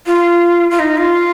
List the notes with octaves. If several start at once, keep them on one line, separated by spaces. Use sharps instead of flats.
F4
F4
D#4
F4